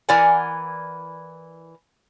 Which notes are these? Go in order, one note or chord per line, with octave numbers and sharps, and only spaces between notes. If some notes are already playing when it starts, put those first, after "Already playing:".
E3 E4 A#4 D5 F#5 G#5